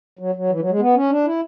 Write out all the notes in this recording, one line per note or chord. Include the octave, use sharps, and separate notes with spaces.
F#3
F#3
E3
F#3
G#3
B3
C#4
D4
E4